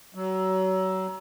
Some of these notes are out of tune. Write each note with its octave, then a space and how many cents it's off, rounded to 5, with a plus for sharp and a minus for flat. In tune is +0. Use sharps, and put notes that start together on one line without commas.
F#3 +30